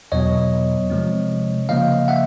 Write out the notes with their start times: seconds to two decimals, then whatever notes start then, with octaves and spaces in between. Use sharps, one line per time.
0.12 E2 B2 F#3 B3 C#5 D#5
0.90 C3 F3 G#3 C4
1.69 C#3 F3 A#3 D#5 F5
2.08 E5 F#5